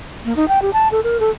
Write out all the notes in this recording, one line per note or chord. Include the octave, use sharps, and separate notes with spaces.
A#3
D#4
G5
G4
A5
A4
A#4
A4